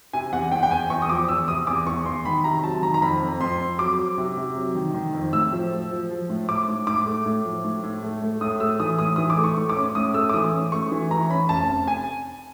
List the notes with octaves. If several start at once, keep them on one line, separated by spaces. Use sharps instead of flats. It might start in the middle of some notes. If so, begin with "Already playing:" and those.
C3 G#5
E2 F#5
E2 G5
G5
E2 G#5
E2 C#6
D#6
F3 D6
E2 E6
C3 D#6
E2 D6
E2 C#6
E2 C6
D#3 B5
C3 A#5
F#3 A5
D#3 A#5
A#5
F2 B5
F2
F2 C6
F2
F#3 D6
F#3
C3
C3
F#3
D#3
D#3
F2
A2 E6
F3
F3
F3
F3
A2
A2 D6
A2
A2 D6
A3
A2
F3
A2
A2
A3
A3
A2 D#6
A3 E6
E3 D#6
A2 D#6
E3 D#6
D6
A3
C#6
A2
D6
C#4
A2 D#6
A3 E6
D6
E3 D#6
C#4
A3 C#6
E3
E3 A#5
C#4 B5
F1 A5
F1
G#5